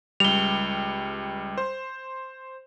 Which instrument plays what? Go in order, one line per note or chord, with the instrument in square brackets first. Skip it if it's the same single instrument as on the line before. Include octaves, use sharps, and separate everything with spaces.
[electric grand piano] C#2 G3 [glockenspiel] F7 G7
[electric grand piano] C5